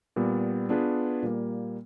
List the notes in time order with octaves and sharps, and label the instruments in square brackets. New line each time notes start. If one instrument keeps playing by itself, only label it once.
[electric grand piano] A#2 G3 B3
B3 D4 F4 G#4 B4
A#2 G3 A#3